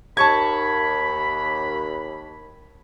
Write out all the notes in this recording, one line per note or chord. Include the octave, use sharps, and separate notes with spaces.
D#2 A5 B5 C#6 G#6